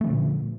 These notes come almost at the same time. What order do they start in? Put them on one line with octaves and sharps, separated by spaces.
A3 F3 D3 A#2